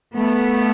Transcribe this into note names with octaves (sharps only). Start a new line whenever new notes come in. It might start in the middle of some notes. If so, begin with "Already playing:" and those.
A3 B3